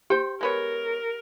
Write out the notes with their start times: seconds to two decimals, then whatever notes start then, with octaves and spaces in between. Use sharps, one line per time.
0.10 G4 C5 G5
0.41 G#3 B3 A#4 C#5